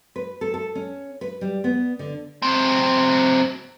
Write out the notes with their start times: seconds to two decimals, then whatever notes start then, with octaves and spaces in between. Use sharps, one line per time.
0.16 B4
0.41 A4
0.54 A4
0.75 C#4
1.21 B4
1.41 G3
1.64 B3
1.99 D3
2.42 F#3 C4